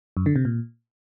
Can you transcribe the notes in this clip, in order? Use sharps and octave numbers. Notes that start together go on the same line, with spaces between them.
F#2
D3
C3
A#2